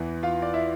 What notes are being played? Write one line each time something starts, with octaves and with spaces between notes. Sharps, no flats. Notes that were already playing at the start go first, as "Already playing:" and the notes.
Already playing: E2 E3
F4 F5
D5
E4 E5